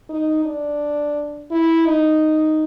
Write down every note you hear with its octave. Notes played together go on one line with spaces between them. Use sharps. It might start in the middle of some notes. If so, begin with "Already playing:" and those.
D#4
D4
E4
D#4